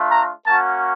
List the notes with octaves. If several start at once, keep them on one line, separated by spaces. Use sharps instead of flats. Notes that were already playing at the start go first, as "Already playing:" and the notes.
Already playing: A3 D4 F4
A#5
A#3 C#4 F#4 A5